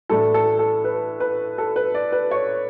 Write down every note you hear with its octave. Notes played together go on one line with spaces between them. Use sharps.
A2 E3 A3 D4 A4
A4
A4
B4
B4
A4
B4
D5
B4
C#5